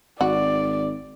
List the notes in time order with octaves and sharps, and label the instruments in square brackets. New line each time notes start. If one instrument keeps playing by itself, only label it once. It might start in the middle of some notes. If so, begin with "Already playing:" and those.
[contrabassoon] G#1 [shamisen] F#4 [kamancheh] D5